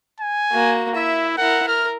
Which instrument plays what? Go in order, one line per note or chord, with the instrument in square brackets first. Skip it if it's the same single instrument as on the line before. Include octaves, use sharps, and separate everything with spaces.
[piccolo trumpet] G#5
[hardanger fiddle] A#3 F#4
[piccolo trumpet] E4 [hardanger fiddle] E5
[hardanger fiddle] E4 A#4 [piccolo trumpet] F#5
[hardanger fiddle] A#4 [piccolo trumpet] F6